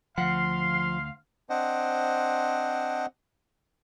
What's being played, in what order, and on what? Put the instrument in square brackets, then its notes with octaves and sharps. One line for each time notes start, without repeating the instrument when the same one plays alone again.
[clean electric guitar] D2 F#5 [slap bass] F3 [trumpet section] F5 [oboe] C6
[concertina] C4 D4 C5 D#5 F#5